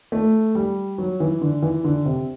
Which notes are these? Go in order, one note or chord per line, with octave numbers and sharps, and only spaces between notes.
A3
G3
F#3
E3
D3
E3
D3
C3